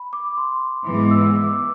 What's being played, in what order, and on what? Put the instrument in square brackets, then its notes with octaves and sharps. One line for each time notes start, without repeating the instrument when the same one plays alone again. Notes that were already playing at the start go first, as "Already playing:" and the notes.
Already playing: [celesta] B5
D6
C6
[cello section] G#2 E3 G#3 B3 [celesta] D6
[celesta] E6
D6